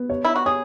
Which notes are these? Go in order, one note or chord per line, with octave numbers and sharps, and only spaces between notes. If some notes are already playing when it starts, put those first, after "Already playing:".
Already playing: B3
C#5
E4
F#4
G#4 C#5